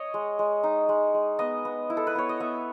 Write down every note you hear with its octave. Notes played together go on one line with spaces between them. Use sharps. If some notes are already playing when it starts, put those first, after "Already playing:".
Already playing: C#5 D#5
G#3
G#3
D#4
G#3
G#3
B3 D#5
B3
E4
A4
B4
B3 C#5
D#5
B3 E5